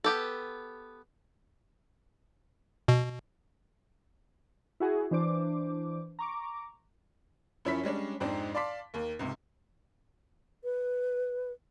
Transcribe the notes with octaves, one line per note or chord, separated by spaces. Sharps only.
B3 G4 A4
B2
E4 F#4 G#4
E3 D4 C5 D6
A#5 C#6 D6
F#2 F3 C#4 E4 B5 B6
G3 G#3 C#4 D4
F2 G#2 C4 D4 D#4
D5 F5 A5 C6 D6 B6
D#2 A#3
C#2 G#2 C3
B4